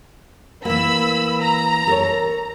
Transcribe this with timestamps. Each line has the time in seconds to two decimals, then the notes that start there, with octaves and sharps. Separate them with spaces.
0.65 E3 A#3 B5 E6
1.40 A#5
1.87 A4 A#4 C#5